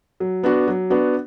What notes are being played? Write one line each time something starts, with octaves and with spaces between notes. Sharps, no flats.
F#3
B3 D4 F#4
F#3
B3 D4 F#4